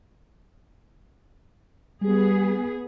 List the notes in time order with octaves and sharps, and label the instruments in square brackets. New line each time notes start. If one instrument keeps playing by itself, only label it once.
[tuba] G3 [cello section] B3 G#4